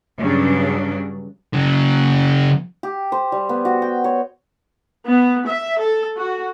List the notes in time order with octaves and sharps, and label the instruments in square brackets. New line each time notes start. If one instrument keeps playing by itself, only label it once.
[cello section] G2 C#3 F#3 D4
[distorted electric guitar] C#3 F#3
[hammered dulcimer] G4
C5
G3
B3
F#4
G5
C#5
[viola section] B3
E5
A4
F#4